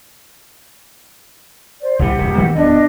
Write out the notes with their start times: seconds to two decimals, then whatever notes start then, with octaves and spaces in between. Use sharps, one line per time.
1.82 C5 D5
1.99 C2 A2 E3 G4 F#5
2.18 D#1 C#2 C3
2.35 D#3 F#3 A#3
2.56 D1 E2 B3 D4 D#5